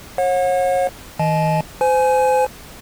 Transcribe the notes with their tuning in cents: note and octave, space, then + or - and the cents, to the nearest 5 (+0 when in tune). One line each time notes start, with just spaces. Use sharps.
C#5 -35 F#5 -35
D#3 +40 D#5 +0 A5 -45
C5 -30 G#5 +15